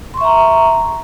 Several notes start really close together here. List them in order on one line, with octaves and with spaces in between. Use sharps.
C6 C#6 E5 A#5